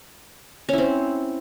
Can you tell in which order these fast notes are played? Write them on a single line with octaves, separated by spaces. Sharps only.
C#4 E4 C4